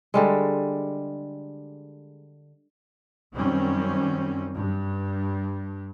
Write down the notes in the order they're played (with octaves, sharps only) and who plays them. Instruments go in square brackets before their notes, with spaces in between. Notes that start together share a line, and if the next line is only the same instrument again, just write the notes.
[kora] D3 G3 G#3
[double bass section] F#2 D#3 G3 C4 C#4
G2